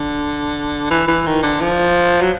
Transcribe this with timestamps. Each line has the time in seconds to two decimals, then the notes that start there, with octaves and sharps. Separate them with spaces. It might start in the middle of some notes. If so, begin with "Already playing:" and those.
Already playing: D3
0.90 E3
1.07 E3
1.26 D#3
1.43 D3
1.61 F3
2.22 F#3